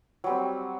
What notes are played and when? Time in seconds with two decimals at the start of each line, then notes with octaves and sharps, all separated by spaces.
0.24 F#3
0.26 G3
0.29 C4